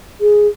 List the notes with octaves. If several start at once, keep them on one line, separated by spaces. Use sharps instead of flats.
G#4